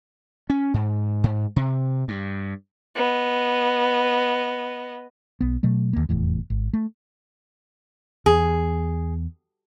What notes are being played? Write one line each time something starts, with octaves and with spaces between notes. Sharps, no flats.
C#4
G#2
G#2
C3
G2
B3 D#5
B1 B3
B2 F#3 A3
D#2 A#3
F1 E2 A2
G#1
A3
E2 G#4